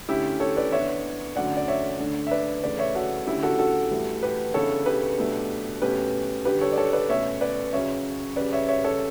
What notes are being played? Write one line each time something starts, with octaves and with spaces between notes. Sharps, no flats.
D3 A3 C#4 E4 G4
A4 C#5
B4 D5
E3 B3 D4 C#5 E5
D3 F#3 A3 C#4 D5 F#5
D5
C#5 E5
D3 A3 D4
E5
B4 D5
C#3 E3 A3 B4 D5
C#5 E5
F#4 A4
D3 A3 C#4 E4 G4
F#4 A4
F#4 A4
A2 E3 G3
G4 B4
C#3 E3 B3 D4 A4 C#5
G4 B4
B2 F#3 A3 D4
B2 A3 C#4 G4 B4
D3 G3 D4 G4 B4
A4 C#5
D5
A4 C#5
B4 D5
B2 A3 C#4 C#5 E5
B4 D5
C#3 F#3 C#4 C#5 E5
C#3 G3 C#4 B4 D5
C#5 E5
C#5 E5
A4 C#5